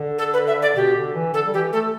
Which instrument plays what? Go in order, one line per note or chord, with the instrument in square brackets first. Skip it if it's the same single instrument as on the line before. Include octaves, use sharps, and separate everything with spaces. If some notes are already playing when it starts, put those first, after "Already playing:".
Already playing: [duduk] D3
[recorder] A4
B4
E5
D5
[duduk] B2 [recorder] G4
[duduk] D3
E3
[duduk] D3 [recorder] A4
[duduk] G3
[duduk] E3 [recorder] G4
[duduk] A3 [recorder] A4